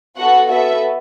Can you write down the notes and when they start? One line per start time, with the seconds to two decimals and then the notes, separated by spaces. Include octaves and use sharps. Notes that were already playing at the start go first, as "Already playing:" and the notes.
0.18 B3 F#4 A4 F#5
0.50 B3 F#4 A4 E5